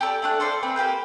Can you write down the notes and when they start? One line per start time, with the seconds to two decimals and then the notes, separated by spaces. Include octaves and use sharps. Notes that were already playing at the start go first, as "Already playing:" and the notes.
0.01 G4 A4 A#4 D5
0.22 A3 D4 F#6
0.40 A4 C5 D5 F5
0.63 A3 C4 B4
0.76 A#3 G4 B4 G6